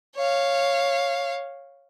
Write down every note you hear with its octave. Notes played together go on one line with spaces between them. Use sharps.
C#5 F5